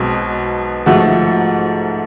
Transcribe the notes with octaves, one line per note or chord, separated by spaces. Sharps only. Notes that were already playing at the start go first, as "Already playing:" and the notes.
Already playing: B1 B2 G#3 C4
G#2 F3 A3 F#4